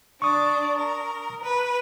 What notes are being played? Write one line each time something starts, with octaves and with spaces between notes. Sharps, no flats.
D4 D5 C#6 D#6
A#4
B4